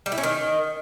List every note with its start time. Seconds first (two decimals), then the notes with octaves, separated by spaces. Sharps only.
0.06 G3
0.12 E4
0.18 C#4
0.23 D#3